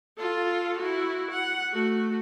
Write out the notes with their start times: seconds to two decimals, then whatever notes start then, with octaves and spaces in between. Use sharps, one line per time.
0.19 F4 A4
0.78 E4 F#4
1.32 F#5
1.73 A3 F#4